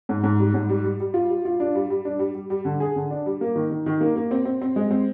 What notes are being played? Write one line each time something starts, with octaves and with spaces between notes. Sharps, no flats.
G#2
G#2
G3
G#2
G3
G3
G3
F4
G3
F4
D4
G3
G3
D4
G3
G3
G3
D3
G#4
D3
D4
G3
A#3
D#3
D#3
D#3
A#3
A#3
C4
C4
C4
G#3
C4